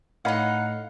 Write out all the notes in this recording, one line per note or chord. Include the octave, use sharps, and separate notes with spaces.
A2 D#4 C#5 D#5 F5 F#5 B5